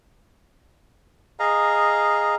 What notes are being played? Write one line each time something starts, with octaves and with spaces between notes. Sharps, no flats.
G#4 D#5 F5 A#5